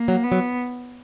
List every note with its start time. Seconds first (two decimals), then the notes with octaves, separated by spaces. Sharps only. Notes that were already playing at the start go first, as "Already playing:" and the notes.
Already playing: A#3
0.08 F#3
0.24 B3
0.32 F#3